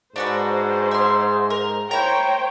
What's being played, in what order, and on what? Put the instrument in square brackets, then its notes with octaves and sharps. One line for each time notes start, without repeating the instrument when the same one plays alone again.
[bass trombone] G#2 [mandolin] D4 F#4 B4 [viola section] C5
[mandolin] E5 C6
A#4
[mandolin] E4 A#5 [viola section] C5 C#5 G5